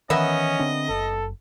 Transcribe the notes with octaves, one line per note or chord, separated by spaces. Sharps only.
D#3 E3 A#3 B3 C#4 D#5 E5
D3 C4 D4
F#1 A4